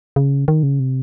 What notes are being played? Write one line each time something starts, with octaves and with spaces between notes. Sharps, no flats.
C#3
D#3
C#3
C3